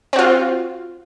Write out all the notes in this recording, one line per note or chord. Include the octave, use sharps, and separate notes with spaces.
C4 F4 F#4